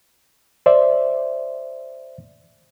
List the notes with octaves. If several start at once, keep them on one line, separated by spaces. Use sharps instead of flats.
C5 D5 E5